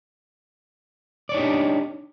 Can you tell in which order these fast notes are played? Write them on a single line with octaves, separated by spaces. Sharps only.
D5 C#5 D#4 G4 D4